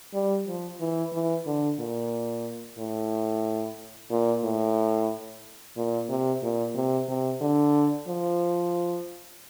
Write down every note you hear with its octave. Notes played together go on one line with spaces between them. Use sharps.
G3
F3
E3
E3
D3
A#2
A2
A#2
A2
A#2
C3
A#2
C3
C3
D3
F3